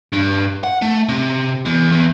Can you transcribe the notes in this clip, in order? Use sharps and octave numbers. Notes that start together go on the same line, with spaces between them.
G2
F#5
A3
C3
E2
E2